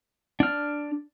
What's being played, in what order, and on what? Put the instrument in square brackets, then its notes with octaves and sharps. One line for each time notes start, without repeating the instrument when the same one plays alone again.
[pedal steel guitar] D4 F6